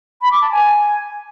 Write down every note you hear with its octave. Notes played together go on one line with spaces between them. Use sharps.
B5
D6
A5
G#5